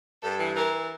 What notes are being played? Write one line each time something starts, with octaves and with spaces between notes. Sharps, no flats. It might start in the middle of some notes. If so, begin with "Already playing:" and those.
G2 A4
E3
E3 A#4